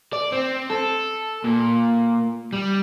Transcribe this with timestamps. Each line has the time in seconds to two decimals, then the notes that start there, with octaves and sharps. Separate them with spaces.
0.13 D5
0.32 C4
0.70 A4
1.45 A#2
2.53 G3